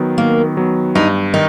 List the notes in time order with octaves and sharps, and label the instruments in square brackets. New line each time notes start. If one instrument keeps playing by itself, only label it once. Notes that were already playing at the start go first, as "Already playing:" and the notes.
Already playing: [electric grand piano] D#3 F#3 B3
[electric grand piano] D#3 [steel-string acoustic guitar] A#3
[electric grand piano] F#3 B3
[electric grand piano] G2 [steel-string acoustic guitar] D#4
[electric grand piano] D#3 [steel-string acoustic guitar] D#4